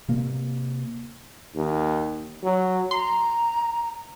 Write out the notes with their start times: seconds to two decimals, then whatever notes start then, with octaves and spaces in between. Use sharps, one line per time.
0.08 C3 A#3
1.55 D#2
2.43 F#3
2.91 A#5 C6